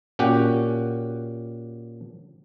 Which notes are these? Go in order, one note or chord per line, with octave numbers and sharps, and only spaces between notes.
A#2 C#4 F#4 G4 F#5